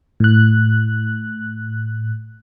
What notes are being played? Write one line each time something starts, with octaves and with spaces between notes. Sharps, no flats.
A2 F#6